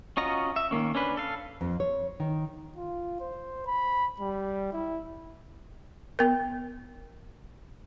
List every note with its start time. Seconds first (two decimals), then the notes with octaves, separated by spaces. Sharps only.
0.17 C#4 F4 F#4 D#5 A#5
0.56 E5
0.71 D#3 A3 A#3 C#4
0.95 C#4 D4 B4
1.17 A4 F5
1.61 F2
1.80 C#5
2.20 D#3
2.77 F4
3.20 C5
3.67 B5
4.20 G3
4.73 E4
6.19 B3 A#4